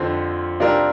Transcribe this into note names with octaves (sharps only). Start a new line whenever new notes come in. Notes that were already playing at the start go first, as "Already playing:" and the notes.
Already playing: F2 D3 F3 C4
C3 G3 D4 F4 A#4